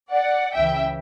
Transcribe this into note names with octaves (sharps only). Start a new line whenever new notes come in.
D5 F#5
C#2 C#3 E3 E5 G5